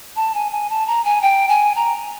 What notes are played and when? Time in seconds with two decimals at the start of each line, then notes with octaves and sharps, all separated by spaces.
0.16 A5
0.35 G#5
0.52 G#5
0.70 A5
0.87 A#5
1.05 G#5
1.22 G5
1.49 G#5
1.76 A#5